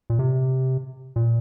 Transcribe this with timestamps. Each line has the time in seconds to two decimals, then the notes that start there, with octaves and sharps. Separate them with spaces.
0.10 A#2
0.19 C3
1.16 A#2